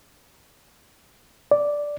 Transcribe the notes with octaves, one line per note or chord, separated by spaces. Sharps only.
D5